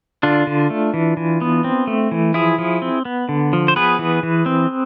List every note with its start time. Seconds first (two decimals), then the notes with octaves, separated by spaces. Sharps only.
0.23 D3 D4 F4
0.47 D3
0.70 A3
0.94 E3
1.17 E3
1.41 B3
1.64 C4
1.87 A3
2.11 E3
2.34 F3 E4 G#4
2.58 F3
2.82 C4
3.05 B3
3.29 D3
3.53 F3
3.68 C5
3.76 B3 G#4 B4
3.99 E3
4.23 E3
4.46 C4